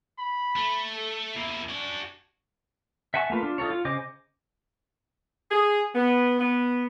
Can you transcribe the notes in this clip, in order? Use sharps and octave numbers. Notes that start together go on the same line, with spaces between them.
B5
A3
A4
E2 A#3 E4
D4 F#4 G#5
E5 F#5 G#5 A5 C#6
A3 A#3 F4 B4
D4 F4
D#4 F4 A4 C#5
F4
C#3 C5 D#5 G#5 D6
G#4
B3
B3